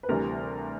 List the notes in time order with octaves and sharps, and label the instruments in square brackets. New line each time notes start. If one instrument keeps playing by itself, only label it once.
[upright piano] B4
D2 C3 E3 G3 A#4